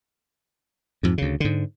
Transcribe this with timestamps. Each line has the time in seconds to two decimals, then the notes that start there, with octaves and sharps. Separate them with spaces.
1.03 F2 G#2
1.18 D2 C#3
1.40 G#2 D3